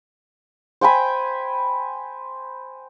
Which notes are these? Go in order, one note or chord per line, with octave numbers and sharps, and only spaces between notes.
C5 G5 G#5 B5